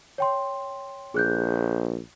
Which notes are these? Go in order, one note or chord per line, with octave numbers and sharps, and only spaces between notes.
C#5 G5 C6
A#1 G#4 F#6 G6